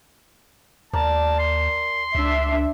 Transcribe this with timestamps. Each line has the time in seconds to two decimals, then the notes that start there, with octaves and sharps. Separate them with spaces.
0.93 D#2 A#4 D5 A5
1.39 C6
2.15 C#2 D4 E5